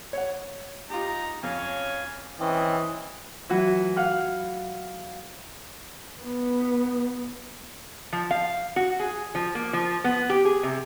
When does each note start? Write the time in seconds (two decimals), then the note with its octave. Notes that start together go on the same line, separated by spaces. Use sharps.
0.13 C#5 F#5
0.90 D#4 F4 G4 A#5
1.43 F2 C#4 C#5 F5 G#5
2.40 E3 C4 C#4 D#5
3.49 E3 F#3 F#4
3.96 F5 F#5 F6
6.22 B3
8.13 F3
8.31 F5
8.76 F#4
9.00 G#4
9.35 F3
9.55 A#3
9.73 F3
10.04 B3
10.30 G4
10.45 G#4
10.63 C3